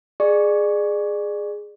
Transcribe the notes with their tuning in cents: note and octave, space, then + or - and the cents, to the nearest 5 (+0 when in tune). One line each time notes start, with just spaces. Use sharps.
G#4 +0 D5 +30 C#6 +0